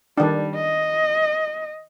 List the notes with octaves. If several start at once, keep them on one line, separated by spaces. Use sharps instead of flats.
D#3 G3 D4
D#5